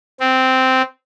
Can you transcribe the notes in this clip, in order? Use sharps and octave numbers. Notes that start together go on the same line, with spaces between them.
C4